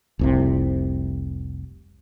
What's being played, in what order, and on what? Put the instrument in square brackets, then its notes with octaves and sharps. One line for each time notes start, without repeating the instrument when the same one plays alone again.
[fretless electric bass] F1 C2 C3